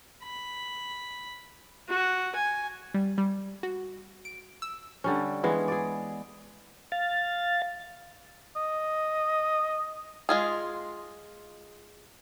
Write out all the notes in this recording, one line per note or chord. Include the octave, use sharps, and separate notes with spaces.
B5
F#4
G#5
G3
G3
F#4
D7
E6
D3 G3 C#4
E3 G#3 B3
G#4 D5
F5 A6
D#5
G#3 F4 G#4